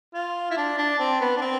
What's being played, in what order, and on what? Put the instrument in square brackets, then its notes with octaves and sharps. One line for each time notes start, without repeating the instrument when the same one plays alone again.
[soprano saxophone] F4
E4
D4
D4
C4
B3
D4
C4